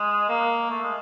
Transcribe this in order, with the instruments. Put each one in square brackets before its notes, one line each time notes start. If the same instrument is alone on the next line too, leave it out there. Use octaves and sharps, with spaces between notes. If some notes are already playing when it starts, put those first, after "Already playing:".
Already playing: [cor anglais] G#3
A#3
A3
G#3